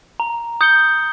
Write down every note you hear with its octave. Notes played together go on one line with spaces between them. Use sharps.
A#5
D#6 G6 C#7 G7